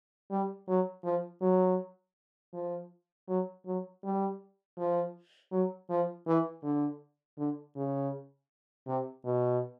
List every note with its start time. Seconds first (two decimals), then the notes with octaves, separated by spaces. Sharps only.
0.31 G3
0.68 F#3
1.04 F3
1.41 F#3
2.53 F3
3.28 F#3
3.66 F#3
4.04 G3
4.78 F3
5.52 F#3
5.90 F3
6.27 E3
6.63 D3
7.38 D3
7.76 C#3
8.87 C3
9.25 B2